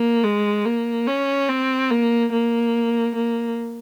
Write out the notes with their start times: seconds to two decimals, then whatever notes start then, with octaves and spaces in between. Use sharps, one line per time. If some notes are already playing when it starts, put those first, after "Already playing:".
Already playing: A#3
0.24 G#3
0.65 A#3
1.07 C#4
1.49 C4
1.90 A#3
2.32 A#3
3.15 A#3